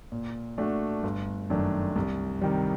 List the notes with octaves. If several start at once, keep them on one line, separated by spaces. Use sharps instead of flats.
A#2
A3 D4 F#4
G1
F#2 D#3 A3 D4
C2
C3 D#3 G3